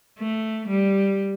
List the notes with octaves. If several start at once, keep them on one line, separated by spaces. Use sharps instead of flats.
A3
G3